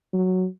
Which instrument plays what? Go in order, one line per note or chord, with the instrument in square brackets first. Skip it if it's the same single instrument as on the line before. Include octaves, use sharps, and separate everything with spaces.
[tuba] F#3